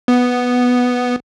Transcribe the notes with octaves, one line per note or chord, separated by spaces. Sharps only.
B3